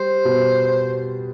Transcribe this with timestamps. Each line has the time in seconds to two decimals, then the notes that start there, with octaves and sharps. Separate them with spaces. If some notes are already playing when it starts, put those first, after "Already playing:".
Already playing: G3 C5
0.25 B2 B3